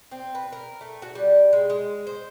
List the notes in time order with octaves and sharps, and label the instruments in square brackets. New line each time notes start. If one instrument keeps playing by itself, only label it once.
[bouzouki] C4
B4
A#4
A3
F#4
G3
G#3
G#3
C5